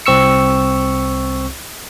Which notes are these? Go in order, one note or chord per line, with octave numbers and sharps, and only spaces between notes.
C2 C4 C#6 E6 C#7